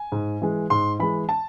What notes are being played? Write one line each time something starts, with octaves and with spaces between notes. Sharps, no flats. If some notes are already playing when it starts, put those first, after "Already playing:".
Already playing: G#5
G#2
E3 G#3
G#2 C6
E3 G#3 B5
A5